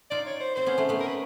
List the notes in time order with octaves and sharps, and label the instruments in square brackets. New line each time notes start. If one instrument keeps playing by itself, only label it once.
[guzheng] D#4 F4 [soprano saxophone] D5
[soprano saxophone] C#5
C5
[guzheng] C4 [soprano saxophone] C5
[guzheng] B3 C#4
A3 B3
A3 B3
[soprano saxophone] A#4
B4